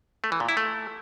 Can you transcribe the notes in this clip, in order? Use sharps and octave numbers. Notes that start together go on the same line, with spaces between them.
A3
E3
A#2
E4
A3